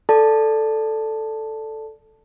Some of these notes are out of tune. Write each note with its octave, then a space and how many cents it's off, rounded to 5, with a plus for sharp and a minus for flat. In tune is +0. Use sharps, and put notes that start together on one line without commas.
A4 +0 D5 +0 A5 +0